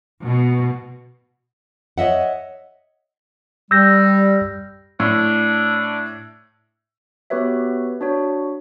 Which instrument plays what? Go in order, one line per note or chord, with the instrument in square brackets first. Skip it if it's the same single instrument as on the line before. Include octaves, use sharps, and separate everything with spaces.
[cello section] B2
[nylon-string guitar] C#5 D#5 E5 F#5
[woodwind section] G3 [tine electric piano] E6 G6 A#6
[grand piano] A2 [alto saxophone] D4
[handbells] B3 F#4 G4 B4 C#5 E5
D4 F#4 C#5